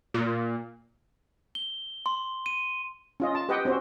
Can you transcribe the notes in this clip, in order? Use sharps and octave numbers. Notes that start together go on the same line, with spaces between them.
A#2
G7
C6
D#7
C#4 F4 D#5
A5
G4 B4 D#5 F#5 G5
C4 C#4 F#4 C5